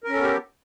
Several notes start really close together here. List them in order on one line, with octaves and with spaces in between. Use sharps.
A#4 C#4 A4 B3 G4